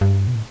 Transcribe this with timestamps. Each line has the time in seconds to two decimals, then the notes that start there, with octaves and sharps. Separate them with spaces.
0.01 G2
0.27 B2
0.35 A2